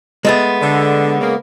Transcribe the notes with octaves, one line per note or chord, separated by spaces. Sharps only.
G#3 A3 B3
D3
C#3 A#3